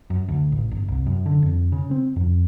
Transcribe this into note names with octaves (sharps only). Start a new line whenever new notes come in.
F#2
D2
A1
G1
C2
F#2
D3
F2
C#3
C4
F2